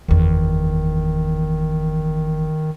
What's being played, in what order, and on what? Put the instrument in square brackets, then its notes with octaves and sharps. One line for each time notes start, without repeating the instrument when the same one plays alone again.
[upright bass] F#1 E2 [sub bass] D#3